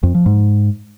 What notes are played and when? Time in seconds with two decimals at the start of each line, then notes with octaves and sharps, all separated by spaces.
0.03 F2
0.15 F3
0.26 G#2